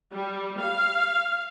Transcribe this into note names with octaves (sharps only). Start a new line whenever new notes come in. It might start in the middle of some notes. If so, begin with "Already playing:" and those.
G3
F5